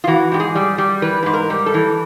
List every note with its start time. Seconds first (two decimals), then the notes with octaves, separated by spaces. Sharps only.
0.04 F4
0.07 E3 F#4
0.32 G#2 G4
0.40 G#4
0.55 G3
0.78 G3
1.02 E3 B4
1.23 G#2 B4
1.34 A#4
1.50 G3
1.66 A4
1.74 E3